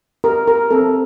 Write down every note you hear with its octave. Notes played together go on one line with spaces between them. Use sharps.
G4 A#4
G4 A#4
C4 A4